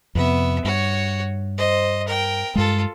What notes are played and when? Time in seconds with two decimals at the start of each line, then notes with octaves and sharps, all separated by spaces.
0.15 F2 C3 B3 E5
0.65 G2 F#4 C#5
1.58 C5 D#5
2.07 A#4 G5
2.55 G2 G#3 F4 A4